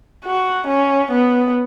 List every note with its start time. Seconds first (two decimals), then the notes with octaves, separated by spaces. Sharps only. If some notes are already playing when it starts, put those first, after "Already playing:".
0.25 F#4
0.68 C#4
1.12 B3